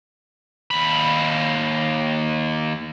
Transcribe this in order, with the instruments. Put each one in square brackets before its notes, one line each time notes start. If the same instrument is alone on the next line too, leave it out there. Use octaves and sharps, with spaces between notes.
[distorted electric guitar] D#2 B5